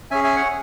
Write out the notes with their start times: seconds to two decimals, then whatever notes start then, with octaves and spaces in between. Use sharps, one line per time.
0.11 C#4 G#4 E5 G#5
0.24 E5 G#5
0.36 C#5 F#5